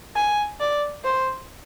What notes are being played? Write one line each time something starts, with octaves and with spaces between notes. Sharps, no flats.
G#5
D5
C5